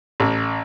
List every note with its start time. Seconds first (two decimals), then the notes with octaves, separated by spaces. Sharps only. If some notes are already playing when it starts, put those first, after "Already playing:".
0.20 A1